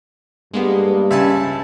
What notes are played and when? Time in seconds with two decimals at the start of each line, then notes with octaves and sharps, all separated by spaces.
0.54 G2 G#3 A#3 B3
1.11 C#2 E5 G#5 A5